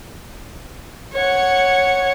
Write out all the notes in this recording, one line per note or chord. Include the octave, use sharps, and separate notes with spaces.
C#5 F#5